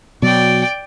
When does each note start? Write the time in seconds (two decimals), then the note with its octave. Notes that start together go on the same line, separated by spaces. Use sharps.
0.22 B2 F#3 D5 G5